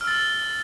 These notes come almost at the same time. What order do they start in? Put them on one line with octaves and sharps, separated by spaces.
F6 E6 A6